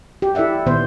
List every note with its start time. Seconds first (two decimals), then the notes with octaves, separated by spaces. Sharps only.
0.22 G4
0.35 E4 A4 D5 E5 F#5
0.66 A#2 D#3 B3 C5